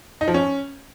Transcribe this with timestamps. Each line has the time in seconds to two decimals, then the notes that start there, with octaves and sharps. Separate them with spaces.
0.21 D#4
0.28 F3
0.34 C#4